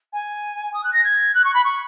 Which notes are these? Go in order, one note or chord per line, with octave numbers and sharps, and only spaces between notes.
G#5
D#6
F#6
A#6
G#6
F#6
C#6
B5
C#6